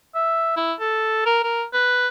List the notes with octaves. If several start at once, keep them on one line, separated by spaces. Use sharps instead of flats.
E5
E4
A4
A#4
A#4
B4